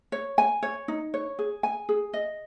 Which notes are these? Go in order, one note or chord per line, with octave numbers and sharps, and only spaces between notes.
C#5
G#5
C#5
D#4
C#5
G#4
G#5
G#4
D#5